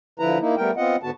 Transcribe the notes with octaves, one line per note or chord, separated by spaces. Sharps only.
D3 F3 E4 B4 A#5
A#3 D#4 E4
G3 A3 B3 A#4 G5
B3 C4 F4 D#5 F#5
G#2 D3 B3 F#4 A5